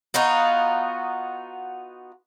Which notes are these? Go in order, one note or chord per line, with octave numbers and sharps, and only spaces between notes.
B3 D#4 F4 F#4